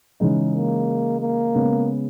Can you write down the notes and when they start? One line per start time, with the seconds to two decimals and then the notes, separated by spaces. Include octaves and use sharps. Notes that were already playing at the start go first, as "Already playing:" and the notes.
0.20 C#3 E3 G#3 D#4
0.54 A#3
1.21 A#3
1.55 C#3 G#3 B3